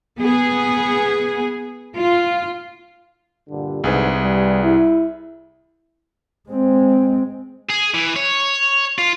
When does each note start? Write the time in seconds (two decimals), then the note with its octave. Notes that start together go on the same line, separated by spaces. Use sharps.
0.21 B3 G#4
1.97 F4
3.50 G2 A#2 D3
3.84 C2 G#2 D3 G#4 B4
4.21 G3
4.62 E4
6.50 G#3 C4
7.69 G#4
7.94 E3
8.16 C#5
8.98 F4